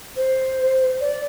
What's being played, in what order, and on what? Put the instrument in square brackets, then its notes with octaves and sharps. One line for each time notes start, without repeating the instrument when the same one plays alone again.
[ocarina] C5
D5